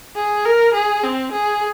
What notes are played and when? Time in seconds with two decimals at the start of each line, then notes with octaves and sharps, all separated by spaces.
0.16 G#4
0.45 A#4
0.74 G#4
1.04 C4
1.32 G#4